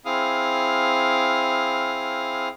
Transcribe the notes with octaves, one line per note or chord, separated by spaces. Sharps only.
C4 E4 G#4 F5 D#6 F6